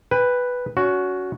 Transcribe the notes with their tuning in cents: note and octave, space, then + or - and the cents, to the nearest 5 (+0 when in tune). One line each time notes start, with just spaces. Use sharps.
B4 +0 G5 +35
C#4 +30 F#4 +0